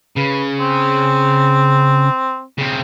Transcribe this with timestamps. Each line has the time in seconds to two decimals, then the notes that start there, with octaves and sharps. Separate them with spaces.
0.17 C#3 B4
0.60 C4
2.58 C#3 C4